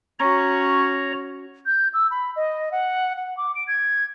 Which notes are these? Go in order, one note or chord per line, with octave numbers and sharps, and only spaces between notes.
C#4 F#4 C#5 A#5
G6
E6
B5
D#5
F#5
F#5
D6
D7
G#6